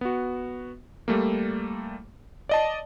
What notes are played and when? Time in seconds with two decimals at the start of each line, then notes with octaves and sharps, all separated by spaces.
0.01 B3 F#4
1.08 G3 A3 A#3
2.49 D5 D#5 A5